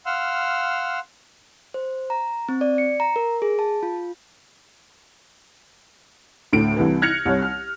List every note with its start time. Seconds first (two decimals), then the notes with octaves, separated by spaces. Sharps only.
0.06 F5 F#5 C6 E6 F6
1.74 C5
2.10 A#5
2.49 C4
2.61 D5
2.78 C#7
3.00 A#5
3.16 A#4
3.42 G#4
3.59 A5
3.83 F4
6.53 D2 A2 D7
6.77 C2 C3 E3
7.02 F6 F#6 G#6 A#6 C#7 F7
7.26 C2 C#5
7.42 F6